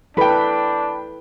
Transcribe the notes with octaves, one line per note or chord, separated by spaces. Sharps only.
D4 E4 A4 B4 G5 B5